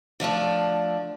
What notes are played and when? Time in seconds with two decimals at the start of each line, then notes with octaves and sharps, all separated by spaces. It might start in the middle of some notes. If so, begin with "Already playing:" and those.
0.20 D3 F3 A3 D4